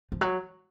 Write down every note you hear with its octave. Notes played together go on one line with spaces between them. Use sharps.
F3
F#3